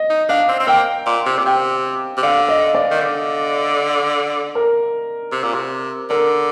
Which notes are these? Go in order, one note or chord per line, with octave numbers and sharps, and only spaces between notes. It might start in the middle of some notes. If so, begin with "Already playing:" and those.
Already playing: D#5
D#4
D4 F5
C4
C4
A#3 G5
A#2
C3
A#2
C3 G5
C3
D3 F5
D#5
D5
D#3
D3
A#4
C3
A#2
C3
D3 A#4